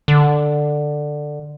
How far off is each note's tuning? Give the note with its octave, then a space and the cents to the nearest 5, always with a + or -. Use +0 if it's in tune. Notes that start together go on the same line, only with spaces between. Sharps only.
D3 +10